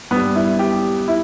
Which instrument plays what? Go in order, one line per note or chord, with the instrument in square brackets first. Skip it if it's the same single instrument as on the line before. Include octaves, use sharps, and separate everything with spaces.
[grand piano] G2 B3
G3
E4
G4
E4